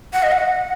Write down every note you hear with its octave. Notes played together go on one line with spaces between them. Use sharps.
F#5
D#5
F#5